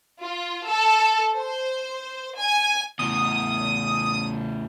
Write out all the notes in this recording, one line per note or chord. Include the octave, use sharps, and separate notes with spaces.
F4
A4
C5
G#5
E2 A2 D#6